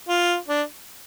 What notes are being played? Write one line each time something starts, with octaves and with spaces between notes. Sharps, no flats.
F4
D4